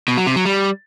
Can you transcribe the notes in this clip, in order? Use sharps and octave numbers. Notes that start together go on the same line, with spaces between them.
B2
F#3
C3
F#3
G3